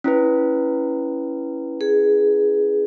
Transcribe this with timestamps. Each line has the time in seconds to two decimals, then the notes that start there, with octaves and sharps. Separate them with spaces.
0.04 C#4 E4 B4
1.81 G#4